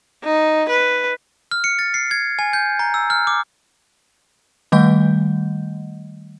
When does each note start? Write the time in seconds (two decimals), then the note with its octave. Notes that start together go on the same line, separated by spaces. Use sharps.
0.24 D#4
0.70 B4
1.51 F6
1.64 C#7
1.79 A6
1.94 C7
2.11 G#6
2.39 G#5
2.53 G6
2.79 A#5
2.94 E6
3.10 F6
3.27 D6
4.72 D#3 G3 A3 D#5 F#5 G6